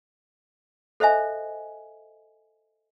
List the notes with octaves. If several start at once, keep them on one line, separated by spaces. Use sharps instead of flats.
A4 C5 D#5 E5 G#5